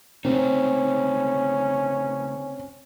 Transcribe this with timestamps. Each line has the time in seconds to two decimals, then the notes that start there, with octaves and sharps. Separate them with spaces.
0.25 C#3 A3 C4 C#4 D#4